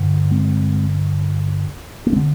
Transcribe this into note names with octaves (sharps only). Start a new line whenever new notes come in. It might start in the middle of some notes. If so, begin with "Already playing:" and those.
Already playing: G2 D3
G#3 C4
A#3
G#3 C4
D3